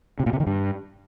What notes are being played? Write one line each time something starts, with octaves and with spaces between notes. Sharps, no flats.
C3
A#2
C3
D#3
G2